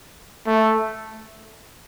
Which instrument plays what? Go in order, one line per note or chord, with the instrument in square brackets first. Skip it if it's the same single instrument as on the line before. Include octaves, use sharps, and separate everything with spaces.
[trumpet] A3